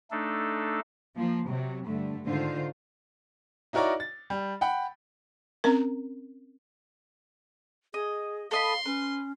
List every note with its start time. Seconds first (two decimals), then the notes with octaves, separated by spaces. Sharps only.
0.11 A3 D4 D#4 A4
1.15 F3 A#3
1.47 C3 F#3
1.84 G2 D3 A3
2.28 G#2 D3 D#3 F4 C5
3.73 D#4 E4 F#4 A#4 C#5 D5
4.00 A6
4.30 G3
4.61 F#5 G5 B5
5.64 C4 C#4 A#4
7.94 G#4 D#5
8.51 A4 D#5 F5 B5 C6
8.86 C#4 B4